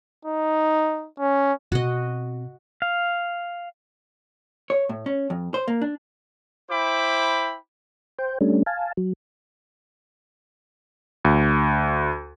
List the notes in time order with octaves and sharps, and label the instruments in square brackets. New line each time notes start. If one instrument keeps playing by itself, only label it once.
[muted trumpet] D#4
C#4
[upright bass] B2 C4 [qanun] F#4 D#5
[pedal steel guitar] F5
[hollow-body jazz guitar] C#5
A2
C#4
F2
C5
A#3
D4
[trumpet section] E4 C5 G5 B5 D6
[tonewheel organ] C5 G5
G3 A3 C#4 D4
F5 G#5 A5
F#3
[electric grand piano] D2